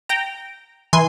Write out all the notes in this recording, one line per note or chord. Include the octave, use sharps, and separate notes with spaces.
G5 A#5
E3 G#5 C6